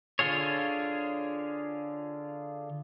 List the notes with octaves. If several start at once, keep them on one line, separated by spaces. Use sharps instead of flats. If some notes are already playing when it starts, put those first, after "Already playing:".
D3 F4 G#4 C#5